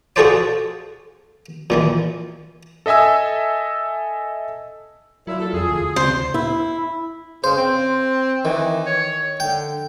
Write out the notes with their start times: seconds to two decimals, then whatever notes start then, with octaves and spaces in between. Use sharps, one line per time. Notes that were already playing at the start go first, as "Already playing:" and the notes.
0.16 F4 F#4 G#4 A4 C5 D5
1.70 A#2 D#3 E3
2.86 A4 D#5 E5 G#5 E6
5.27 A#2 F#3 E4
5.39 F4 A4
5.53 F2 G#4
5.68 D2
5.96 C#3 C4 C5
6.34 E4
7.44 C#3 C5
7.57 C4
8.45 D#3 E3
8.86 C#5
9.40 D3 G5